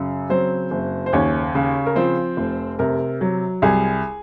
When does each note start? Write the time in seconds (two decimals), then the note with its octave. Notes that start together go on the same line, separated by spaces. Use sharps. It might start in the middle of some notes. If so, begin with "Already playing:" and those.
Already playing: F#2 C#3
0.30 F#3 C4 C5
0.71 F#1
1.06 C5
1.13 D#2 C#4 C#5
1.55 C#3
1.86 A#4
1.96 F3 C4 C5
2.37 F1
2.79 C3 A#4
3.21 F#3
3.62 C2 G#4